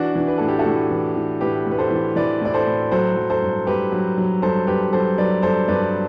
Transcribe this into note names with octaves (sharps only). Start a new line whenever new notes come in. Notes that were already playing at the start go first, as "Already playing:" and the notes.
Already playing: E3 D4 F#4
E3
B4
A2 A4
G4
F#4 A4
A2
E3
E3
A2 G4 B4
A2
B4
A4 C5
E3
E3 B4 D5
A2 D5
A4 C5
A2
F#3 A4 C5
F#3
A4 C5
G2
G2 G4 B4
F#3
F#3
G2 A4 C5
G2 G4 B4
F#3 A4 C5
F#3 B4 D5
G2 A4 C5
G2 B4 D5